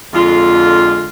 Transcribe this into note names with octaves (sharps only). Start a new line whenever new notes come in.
F2 D3 G#3 F4